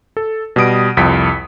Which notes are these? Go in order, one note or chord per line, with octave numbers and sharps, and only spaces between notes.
A4
B2 G3 D#6 D7
C2 F2 B6